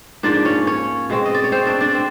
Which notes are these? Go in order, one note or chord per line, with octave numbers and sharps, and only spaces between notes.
G#2 F3 A#3 D4 D5
C#4 C#5
C#4 C#5
B2 G#3 C4
D#5
D5
C#5
C4 C5
D4 D5
D4 D5
C4